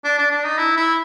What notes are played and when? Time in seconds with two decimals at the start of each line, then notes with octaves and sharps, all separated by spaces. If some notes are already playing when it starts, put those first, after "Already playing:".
0.04 D4
0.18 D4
0.31 D4
0.44 D#4
0.58 E4
0.77 E4